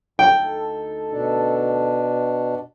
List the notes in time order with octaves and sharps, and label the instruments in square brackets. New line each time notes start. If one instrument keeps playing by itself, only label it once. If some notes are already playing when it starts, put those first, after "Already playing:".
[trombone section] D2 D#4 A4 [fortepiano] G5
[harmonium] B2 D4